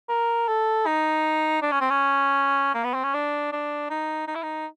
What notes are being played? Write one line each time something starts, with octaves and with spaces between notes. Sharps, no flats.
A#4
A4
D#4
D4
C#4
C4
C#4
A#3
B3
C4
C#4
D4
D4
D#4
D#4
E4
D#4